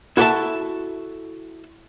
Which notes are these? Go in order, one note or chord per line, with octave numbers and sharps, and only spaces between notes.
E4 F#4 A4 D5 E5 A5